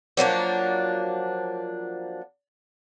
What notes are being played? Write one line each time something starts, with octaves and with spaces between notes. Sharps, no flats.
F3 F#3 A#3 D4